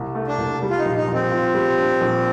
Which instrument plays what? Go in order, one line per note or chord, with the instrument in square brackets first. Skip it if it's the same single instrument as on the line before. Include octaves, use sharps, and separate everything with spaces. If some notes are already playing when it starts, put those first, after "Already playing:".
Already playing: [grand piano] C2
A3
[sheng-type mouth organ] D4
[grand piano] C2
G3
[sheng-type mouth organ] F4
D#4
[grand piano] A#1
[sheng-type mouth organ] D#4
[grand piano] A#1
[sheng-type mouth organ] C4
[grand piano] F4
G3
D4
A#1